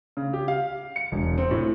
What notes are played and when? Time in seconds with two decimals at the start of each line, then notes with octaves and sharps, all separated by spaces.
0.17 C#3
0.33 G4
0.48 F5
0.96 C#7
1.12 E1
1.38 C4
1.51 A2